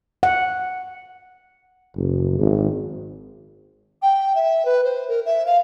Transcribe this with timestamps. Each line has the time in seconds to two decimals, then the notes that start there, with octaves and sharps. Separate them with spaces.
0.23 F#5
1.95 F#1
2.38 G#1
4.02 G5
4.35 E5
4.65 B4
4.85 C5
5.09 A#4
5.26 E5
5.46 F5